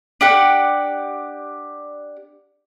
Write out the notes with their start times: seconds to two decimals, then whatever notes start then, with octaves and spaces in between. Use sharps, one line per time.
0.21 D4 G4 F#5